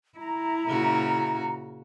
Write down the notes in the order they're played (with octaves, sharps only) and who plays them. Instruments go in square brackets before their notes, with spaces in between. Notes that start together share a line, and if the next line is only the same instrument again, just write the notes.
[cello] E4 [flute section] A#5
[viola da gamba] A#2 C#3 F#4